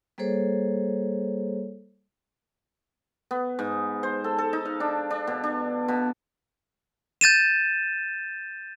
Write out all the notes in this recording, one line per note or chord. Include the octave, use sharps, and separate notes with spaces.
G3 A#3 G#4 A4 C5 C#5
B3
G#2
C5
A4
A4
D#4
F5
D4
D4
B2
D4
B2
G6 A6 D#7 E7